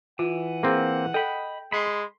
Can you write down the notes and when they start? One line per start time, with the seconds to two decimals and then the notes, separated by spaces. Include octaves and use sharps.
0.19 E3 F4 F#5
0.63 A#3 C4 G#4
1.14 A4 D#5 G5 B5
1.72 G#3 B5 C6